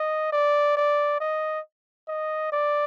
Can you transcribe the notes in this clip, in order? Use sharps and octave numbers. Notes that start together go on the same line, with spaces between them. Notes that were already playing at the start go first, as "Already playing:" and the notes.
Already playing: D#5
D5
D5
D#5
D#5
D5